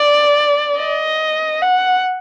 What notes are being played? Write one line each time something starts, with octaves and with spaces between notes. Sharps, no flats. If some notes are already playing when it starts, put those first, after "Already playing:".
Already playing: D5
D#5
F#5